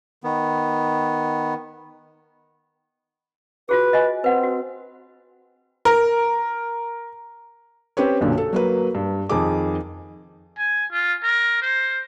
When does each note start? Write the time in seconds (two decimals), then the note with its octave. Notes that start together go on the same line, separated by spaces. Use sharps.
0.24 D#3 B3
3.69 F4 F#4 G#4 B4
3.93 D#5 G#5
4.24 C4 B4 F#5
4.43 F#4
5.85 A#4
7.97 C4 C#4 G4 B4 C#5
8.21 B1 F#2 A#2 D3
8.38 A4
8.53 F#3 A#3 B4
8.95 G2
9.29 F2 D#3 G#4 D6
10.58 G#5
10.92 F4
11.23 A#4
11.62 C5